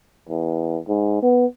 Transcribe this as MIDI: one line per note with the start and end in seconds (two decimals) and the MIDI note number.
0.29 0.78 40
0.88 1.21 44
1.22 1.45 59